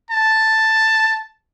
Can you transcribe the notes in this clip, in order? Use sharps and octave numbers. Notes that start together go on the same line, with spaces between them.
A5